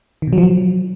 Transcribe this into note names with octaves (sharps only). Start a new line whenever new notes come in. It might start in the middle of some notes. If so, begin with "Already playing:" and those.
D#3
B2
F#3
F3
F#3